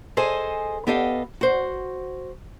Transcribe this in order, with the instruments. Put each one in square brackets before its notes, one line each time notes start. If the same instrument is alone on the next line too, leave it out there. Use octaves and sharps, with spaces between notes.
[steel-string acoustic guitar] G#4 A4 C5 D#5 G#5
B3 G4 A4 D#5 F5
F#4 C5